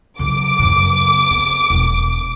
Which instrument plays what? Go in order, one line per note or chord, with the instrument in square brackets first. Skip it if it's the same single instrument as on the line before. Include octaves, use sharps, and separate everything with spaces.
[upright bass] C#3 F#3 [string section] D6
[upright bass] F#2 C#3
C4
E1 D#4